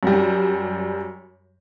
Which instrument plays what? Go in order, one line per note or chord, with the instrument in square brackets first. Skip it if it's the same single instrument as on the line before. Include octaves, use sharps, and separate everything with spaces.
[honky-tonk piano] F#2 G3